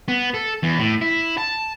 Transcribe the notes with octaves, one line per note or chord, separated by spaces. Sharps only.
B3
A4
E2
A2
E4
A5